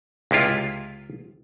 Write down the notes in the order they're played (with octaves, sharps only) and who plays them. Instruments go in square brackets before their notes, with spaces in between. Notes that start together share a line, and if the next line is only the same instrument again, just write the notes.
[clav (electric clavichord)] C#2 C3 E4 F4